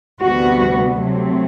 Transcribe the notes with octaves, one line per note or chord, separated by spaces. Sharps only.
D2 C3 G3 B3 F#4
C3 F#3 A3 C4